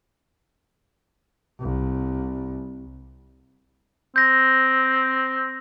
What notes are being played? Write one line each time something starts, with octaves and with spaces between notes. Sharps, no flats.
C2
C4 G6 A#6